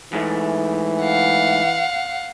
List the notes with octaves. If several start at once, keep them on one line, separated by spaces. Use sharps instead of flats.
G#2 E3 G#3 A3
F5 F#5